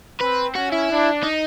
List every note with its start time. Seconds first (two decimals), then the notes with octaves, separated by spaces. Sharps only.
0.20 C4 B4
0.55 C#4 F#4
0.72 E4
0.89 D4
1.23 D#4